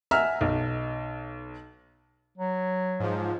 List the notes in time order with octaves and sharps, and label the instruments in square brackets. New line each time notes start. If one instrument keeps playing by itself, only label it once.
[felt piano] E5 F#5 G#5 A#5 E6 F6
B1
[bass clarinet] F#3
[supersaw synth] G#2 F3